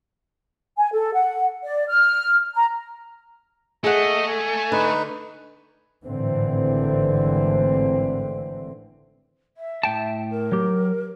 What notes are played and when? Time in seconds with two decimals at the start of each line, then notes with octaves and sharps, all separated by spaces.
0.78 G#5
0.93 A4
1.14 F#5
1.64 D5
1.89 F6
2.55 A#5
3.84 A3 G#4 D#5 F#5
4.27 G#5
4.72 D3 D#4 B4
6.04 G#1 A2 D3 E3 C4
9.57 E5
9.83 A2 G5 A5
10.31 A#4
10.52 F#3 G4